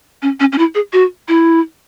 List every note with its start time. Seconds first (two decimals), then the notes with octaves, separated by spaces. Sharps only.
0.22 C#4
0.40 C#4
0.52 C#4
0.58 E4
0.75 G#4
0.93 F#4
1.28 E4